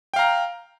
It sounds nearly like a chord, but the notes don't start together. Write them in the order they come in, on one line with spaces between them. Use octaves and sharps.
G5 F5 A#5